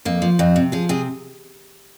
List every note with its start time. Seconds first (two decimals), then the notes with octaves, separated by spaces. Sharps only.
0.05 F2 A#3
0.22 F3
0.39 F2 C4
0.56 C3
0.72 F3 G#4
0.89 C3 G#4